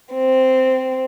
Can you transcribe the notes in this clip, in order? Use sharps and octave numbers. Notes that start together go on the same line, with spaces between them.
C4